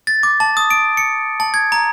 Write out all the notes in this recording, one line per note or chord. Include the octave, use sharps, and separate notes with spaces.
A6
D6
A5
D#6
D7
C#7
A5
G#6
A#5